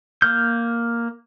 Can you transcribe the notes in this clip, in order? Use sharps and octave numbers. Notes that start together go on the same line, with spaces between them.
A#3 F6 G6